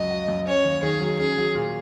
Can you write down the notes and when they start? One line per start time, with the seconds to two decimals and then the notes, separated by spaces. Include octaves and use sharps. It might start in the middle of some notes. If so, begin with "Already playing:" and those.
Already playing: C#2 F#2 F#4 D#5
0.10 F#4
0.28 F#2
0.47 C#4 C#5
0.64 D#2
0.83 D#3 G#4
1.01 F#3
1.19 C#4 G#4
1.38 F#3
1.55 A#2